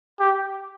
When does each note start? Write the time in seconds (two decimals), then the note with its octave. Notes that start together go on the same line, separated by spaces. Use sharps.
0.20 G4